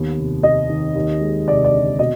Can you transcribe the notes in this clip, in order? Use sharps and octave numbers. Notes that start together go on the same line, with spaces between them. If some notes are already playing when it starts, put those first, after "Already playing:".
Already playing: D#2 B3
F1
F1 D#5
D#3
D#2
G#3
F1 D5
D5
D3
B2 D#5